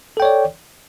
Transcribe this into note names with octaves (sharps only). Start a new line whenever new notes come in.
A4 C#5 D5 G5